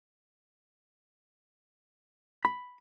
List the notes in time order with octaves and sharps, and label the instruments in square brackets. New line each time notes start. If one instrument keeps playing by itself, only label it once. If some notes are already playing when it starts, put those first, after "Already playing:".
[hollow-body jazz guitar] B5